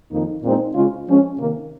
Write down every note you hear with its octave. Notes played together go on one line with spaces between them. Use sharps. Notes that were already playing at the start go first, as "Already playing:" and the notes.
F2 D#3 A#3 D#4
A#2 G#3 C4 D#4
C#3 G#3 C#4 F4
F3 G#3 C#4
C3 D#3 A#3